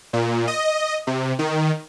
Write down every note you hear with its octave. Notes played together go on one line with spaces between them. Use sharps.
A#2
D#5
C3
D#3